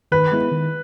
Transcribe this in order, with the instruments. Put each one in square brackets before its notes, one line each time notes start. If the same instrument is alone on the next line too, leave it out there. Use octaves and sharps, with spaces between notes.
[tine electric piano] D#3 [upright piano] B4
[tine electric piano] G#3 B3 E4
D#3